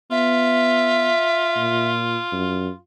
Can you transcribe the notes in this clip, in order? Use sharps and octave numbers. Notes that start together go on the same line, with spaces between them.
B3 F4 E5
A#2
F#2